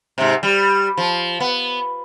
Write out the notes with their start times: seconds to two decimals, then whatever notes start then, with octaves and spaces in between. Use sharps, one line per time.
0.18 G#2 C3
0.43 G3
0.97 F3
1.40 B3